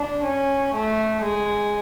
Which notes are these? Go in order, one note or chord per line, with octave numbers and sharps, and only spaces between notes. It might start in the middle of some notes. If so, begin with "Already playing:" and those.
Already playing: D4
C#4
A3
G#3